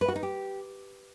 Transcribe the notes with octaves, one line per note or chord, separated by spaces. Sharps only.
B4
F#4
D#4
G4